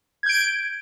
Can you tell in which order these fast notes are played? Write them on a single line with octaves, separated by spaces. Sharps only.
G#6 G6 D7